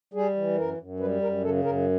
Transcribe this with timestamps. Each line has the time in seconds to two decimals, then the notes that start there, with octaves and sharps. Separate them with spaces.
0.14 G3 G#4
0.36 E3
0.57 F#2 A#4
0.78 F#2
1.00 G3 B4
1.22 F#2 A#4
1.43 C#3 A4
1.64 F#2 A#4